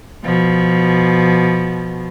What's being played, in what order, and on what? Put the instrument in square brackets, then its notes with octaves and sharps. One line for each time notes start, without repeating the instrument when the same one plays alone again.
[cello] B2 F3